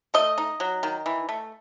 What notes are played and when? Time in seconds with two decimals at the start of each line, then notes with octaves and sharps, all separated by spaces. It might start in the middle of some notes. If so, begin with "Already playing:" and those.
0.14 A3 D#5
0.38 D#4
0.60 F#3
0.83 D#3
1.06 E3
1.29 A3